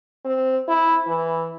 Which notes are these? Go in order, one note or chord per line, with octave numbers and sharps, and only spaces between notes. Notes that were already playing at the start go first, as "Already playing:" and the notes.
C4
E4
E3